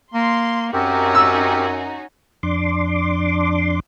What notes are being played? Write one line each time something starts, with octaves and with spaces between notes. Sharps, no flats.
A#3 C6
F#2 C4 C#4 D#4 F#4 G4 A#4
E6
F2 D4 C6 D6